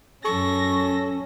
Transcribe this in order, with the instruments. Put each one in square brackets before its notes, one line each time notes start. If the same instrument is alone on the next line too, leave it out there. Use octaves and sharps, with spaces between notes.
[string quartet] F#2 A#6 [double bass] C#4 [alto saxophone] A4 [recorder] C#6